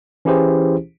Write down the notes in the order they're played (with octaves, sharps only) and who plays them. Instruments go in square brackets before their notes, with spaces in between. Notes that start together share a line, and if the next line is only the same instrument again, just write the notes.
[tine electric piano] E3 C#4 E4 G4 G#4 C5